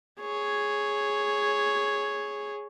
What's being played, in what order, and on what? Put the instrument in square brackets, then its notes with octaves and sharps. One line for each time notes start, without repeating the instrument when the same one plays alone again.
[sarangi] G#4 [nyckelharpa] C#5